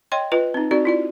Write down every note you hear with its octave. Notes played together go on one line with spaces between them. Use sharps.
C#5 D#5 G5 C6
F4 B4 D#5
C4 D#4
C4 D#4 F#4 A4 D5
E4 F4 D5